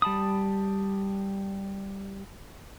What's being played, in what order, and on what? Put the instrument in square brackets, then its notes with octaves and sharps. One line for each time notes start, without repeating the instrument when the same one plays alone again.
[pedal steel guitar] G3 A5 B5 D#6